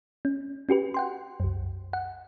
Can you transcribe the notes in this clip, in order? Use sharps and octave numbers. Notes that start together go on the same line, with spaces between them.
C#4
C#4 F#4 G4 B4
F#5 G5 C6
C2 F#2
F#5